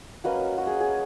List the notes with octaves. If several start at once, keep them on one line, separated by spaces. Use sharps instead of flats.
F#3 A#3 C#4 B4 D#5
F#4
G#4
G#4